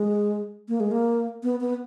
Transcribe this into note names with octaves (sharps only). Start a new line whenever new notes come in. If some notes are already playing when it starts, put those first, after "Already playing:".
Already playing: G#3
A#3
G#3
A#3
B3
B3